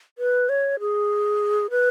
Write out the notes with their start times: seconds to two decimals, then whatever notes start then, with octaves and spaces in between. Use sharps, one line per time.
0.18 B4
0.49 C#5
0.80 G#4
1.70 B4